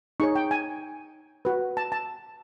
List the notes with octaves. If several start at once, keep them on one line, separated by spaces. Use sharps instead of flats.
D#4 G#4 C#5 C#6
G5
G#5
F#4 B4
A5
A5